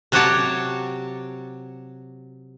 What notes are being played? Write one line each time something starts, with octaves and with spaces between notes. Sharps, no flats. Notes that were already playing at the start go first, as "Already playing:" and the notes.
C3 F#3 F#4 G4 C#5 A5